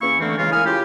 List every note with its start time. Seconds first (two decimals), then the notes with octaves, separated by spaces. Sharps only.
0.01 E2 A#3 C#4 E4 C#6
0.19 D3 E3 A3 A#3 C4
0.37 C#3 E3 G#3 A#3 F4
0.51 A#3 E4 G#5 D#6 F6
0.65 C#3 E4 F4 G4